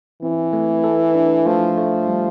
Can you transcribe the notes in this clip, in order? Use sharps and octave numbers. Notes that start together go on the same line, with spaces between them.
E3 C4
A3
A4
D4
F3 A3
A3
G3